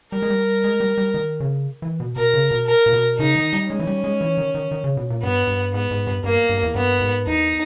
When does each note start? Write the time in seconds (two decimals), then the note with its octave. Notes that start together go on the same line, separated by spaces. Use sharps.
0.12 G3 A#4
0.22 G#3
0.30 G3
0.64 G#3
0.80 G3
0.98 G3
1.14 D#3
1.40 C#3
1.82 E3
2.00 B2
2.16 B2 A#4
2.33 C#3
2.51 B2
2.67 A#4
2.86 A#2
2.93 B2
3.19 C#3 D#4
3.36 D#3
3.53 G3
3.70 G#3 C#4
3.80 E3
3.87 G3
4.04 G#3
4.21 E3
4.38 D#3
4.55 D#3
4.71 D#3
4.84 C#3
4.97 B2
5.10 A#2
5.23 G2 B3
5.47 G2
5.73 G#2 B3
5.91 G#2
6.07 G2
6.24 G2 A#3
6.49 G2
6.63 E2
6.75 G2 B3
7.01 G#2
7.27 E2 D#4